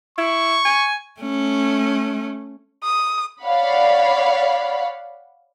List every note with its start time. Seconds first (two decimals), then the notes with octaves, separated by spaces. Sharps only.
0.18 E4 C#6
0.65 G#5
1.20 A3 C#4
2.83 D#6
3.43 C#5 D5 F5 F#5 B5